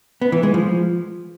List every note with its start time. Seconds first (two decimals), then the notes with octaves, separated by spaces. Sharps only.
0.22 B3
0.32 E3
0.43 G#3
0.54 F3